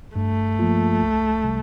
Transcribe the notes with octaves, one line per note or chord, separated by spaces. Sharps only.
G2 A3
F3 A#3 F4
C2
C3 G3